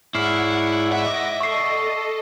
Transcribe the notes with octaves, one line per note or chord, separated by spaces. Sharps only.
G#2 E4 C#5 D5 F#5 F6 C7
D#5 E5 F#5 D6 A#6
A4 D5 D#5 C#6 C7